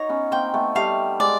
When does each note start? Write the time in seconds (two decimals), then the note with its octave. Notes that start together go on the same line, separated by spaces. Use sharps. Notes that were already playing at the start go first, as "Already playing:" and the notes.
Already playing: D#4 F#4 C#5 A#5
0.09 B3 C#4
0.31 A#3 C4 G5
0.54 A3 B3
0.75 G3 A3 F5
1.20 G#3 D5